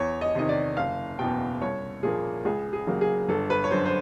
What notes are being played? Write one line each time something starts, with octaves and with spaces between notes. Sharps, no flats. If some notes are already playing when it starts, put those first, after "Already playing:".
Already playing: E2 C#5
D#5
C3 D#3 D#5
D5
F#1 F5
E2 B2 G5
C2 C#5
A#2 F3 A#3 G#4
C#2 G#4
G#4
C#3 F#3 A#3
G#4
G1 A4
B4
C#5
F#2 D3 C5
C5